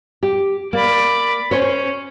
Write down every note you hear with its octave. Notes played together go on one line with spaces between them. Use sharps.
G4
A#3 D5 B5
C#4 C5 C#5